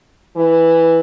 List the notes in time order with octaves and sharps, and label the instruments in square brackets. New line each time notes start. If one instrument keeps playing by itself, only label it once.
[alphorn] E3